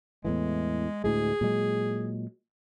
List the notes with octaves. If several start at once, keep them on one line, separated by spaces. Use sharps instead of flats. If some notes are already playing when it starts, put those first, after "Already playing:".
E2 A2 E3 G#3
D2 A2 G#3 G#4
A#2 F#3 G#3